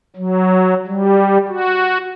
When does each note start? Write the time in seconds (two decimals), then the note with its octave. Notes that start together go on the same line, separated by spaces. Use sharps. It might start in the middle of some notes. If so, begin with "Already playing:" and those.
0.16 F#3
0.87 G3
1.49 F#4